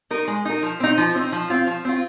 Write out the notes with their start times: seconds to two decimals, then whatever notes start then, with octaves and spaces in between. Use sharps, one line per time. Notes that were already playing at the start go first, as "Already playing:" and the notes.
0.11 D#4 A#4
0.28 G#3
0.45 D#4 A#4
0.63 F3
0.80 C4 D#4
0.98 F3
1.15 C4 D#4
1.32 F3
1.50 C4 F4
1.67 F3
1.85 C4 F4